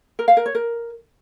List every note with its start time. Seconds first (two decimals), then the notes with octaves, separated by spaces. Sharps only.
0.19 A#4
0.28 F5
0.37 A#4
0.46 C#5
0.55 A#4